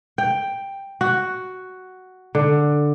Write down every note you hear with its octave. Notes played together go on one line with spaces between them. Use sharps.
G5
F#4
D3